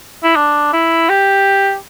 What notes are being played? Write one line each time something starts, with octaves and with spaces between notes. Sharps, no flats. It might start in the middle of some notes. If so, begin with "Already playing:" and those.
E4
D4
E4
G4